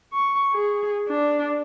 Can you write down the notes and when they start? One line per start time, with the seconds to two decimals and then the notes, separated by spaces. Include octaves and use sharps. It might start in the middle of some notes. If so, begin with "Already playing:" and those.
0.12 C#6
0.53 G#4
1.08 D4